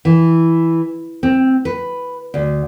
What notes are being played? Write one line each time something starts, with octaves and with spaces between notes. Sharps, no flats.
E3
C4
B4
D2